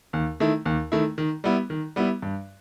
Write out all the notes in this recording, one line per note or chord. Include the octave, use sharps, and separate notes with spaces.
D#2
D#3 A3 E4
D#2
D#3 A3 E4
D#3
G3 B3 E4
D#3
G3 B3 E4
G2